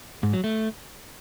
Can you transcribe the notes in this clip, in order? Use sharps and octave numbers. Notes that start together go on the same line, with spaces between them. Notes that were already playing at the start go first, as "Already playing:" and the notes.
G#2
F#3
A3